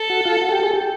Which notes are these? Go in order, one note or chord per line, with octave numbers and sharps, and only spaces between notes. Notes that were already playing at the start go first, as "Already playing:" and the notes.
Already playing: A4
F#4
F4
F#4
G4
G#4
G4